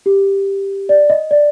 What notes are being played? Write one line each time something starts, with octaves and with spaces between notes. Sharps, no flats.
G4
D5
D#5
D5